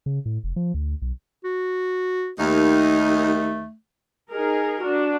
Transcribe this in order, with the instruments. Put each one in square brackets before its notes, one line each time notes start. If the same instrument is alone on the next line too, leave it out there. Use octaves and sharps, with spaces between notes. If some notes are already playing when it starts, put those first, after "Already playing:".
[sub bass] C#3
A2
F1
F3
D2
B1
[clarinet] F#4
[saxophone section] D#2 D#4 [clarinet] A3
[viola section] D#4 G#4 A#4
D4 F#4